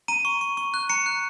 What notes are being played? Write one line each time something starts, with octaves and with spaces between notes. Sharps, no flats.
A#5 D#7
C#6
C#6
C#6
F#6
A#5 C#7
F#6